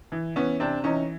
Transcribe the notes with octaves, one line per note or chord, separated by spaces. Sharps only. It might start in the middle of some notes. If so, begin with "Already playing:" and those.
E3
E3 B3 C#4
C3 C4 D4
E3 C#4 D#4